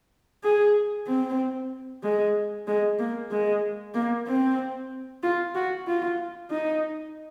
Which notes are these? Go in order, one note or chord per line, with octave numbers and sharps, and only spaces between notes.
G#4
C4
G#3
G#3
A#3
G#3
A#3
C4
F4
F#4
F4
D#4